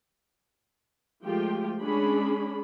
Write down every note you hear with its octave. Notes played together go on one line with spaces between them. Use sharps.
F3 G#3 A3 F4 G4 G5
G#3 C#4 D4 G#4 B5